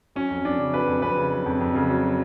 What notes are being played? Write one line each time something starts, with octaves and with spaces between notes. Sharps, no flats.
F#3 C#4
F2
F2 D4
C#3
F#3 B4
F2
F2 B4
C#3
F#3
F2
F2
C#3
F#3